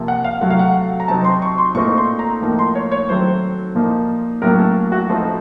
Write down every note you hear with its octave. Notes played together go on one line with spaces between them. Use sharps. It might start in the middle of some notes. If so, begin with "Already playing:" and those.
Already playing: C3 F3 A#3
F#5
F5
C3 F#3 A3 F#5
F5
F#5
A#5
C3 F#3 C4 D#4 A5
C6
C#6
C6
A#2 A3 C4 D#4 C#6
C6
A#5
A2 F3 A#3 D#4
C6
C#5
C#5
D#3 F#3 A3 C4 C5
A#2 F3 A#3 D#4
A2 F#3 A#3 C#4 A#4
A4
F#4
F3 A3 C4 D#4